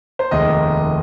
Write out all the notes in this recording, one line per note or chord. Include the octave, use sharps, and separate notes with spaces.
C5
F1 D#2 D#3 G#3 D#5